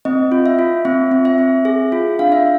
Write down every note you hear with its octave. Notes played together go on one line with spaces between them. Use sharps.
C4 D#5
F4
E5
F4
C4 E5
C4
E5
C4
G#4
F4
D4 F5
E5